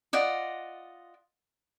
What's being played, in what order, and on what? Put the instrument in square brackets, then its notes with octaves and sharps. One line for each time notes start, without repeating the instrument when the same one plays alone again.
[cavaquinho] F4 D5 D#5 F#5